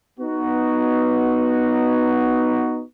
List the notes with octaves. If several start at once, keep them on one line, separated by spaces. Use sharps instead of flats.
B3 D#4 F#4